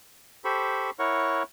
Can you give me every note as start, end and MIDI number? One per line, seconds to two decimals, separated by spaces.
0.45 0.90 67
0.45 0.90 69
0.45 0.90 72
0.45 0.90 83
0.45 0.90 85
0.99 1.43 64
0.99 1.43 70
0.99 1.43 73
0.99 1.43 78
0.99 1.43 85